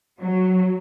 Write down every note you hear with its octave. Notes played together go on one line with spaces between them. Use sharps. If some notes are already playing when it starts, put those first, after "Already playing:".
F#3